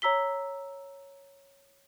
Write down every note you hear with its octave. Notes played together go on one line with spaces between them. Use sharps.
C#5 A#5 E6 B6 G7